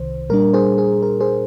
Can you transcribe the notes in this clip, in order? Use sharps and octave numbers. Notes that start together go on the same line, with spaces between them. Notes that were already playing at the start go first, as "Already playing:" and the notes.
Already playing: C2 C3 D#3 C5
A#2 G3 D4 A#4
G#4 C5
G#4
A#4
G#4 C5